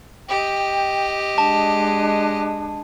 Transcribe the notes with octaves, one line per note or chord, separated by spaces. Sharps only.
G4 D#5 G5
G#3 D4 A5